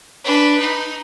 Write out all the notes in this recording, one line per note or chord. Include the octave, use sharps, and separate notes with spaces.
D4 B4
D#4